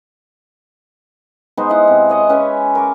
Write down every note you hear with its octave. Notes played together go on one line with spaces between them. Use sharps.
G#3 B3 D#4 C5
E4 F#5
C3
C#5 D#5 F#5
C#4 B4 E5 G#5
A#4 C#6 D6